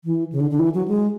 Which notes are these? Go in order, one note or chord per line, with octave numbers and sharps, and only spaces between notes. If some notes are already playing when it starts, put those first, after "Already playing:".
E3
C#3
D3
D3
E3
F#3
G#3